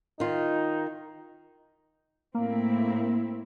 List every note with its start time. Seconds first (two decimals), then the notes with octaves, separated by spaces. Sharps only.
0.20 D#3 D#4 F4
2.35 A2 A#3 C4 E4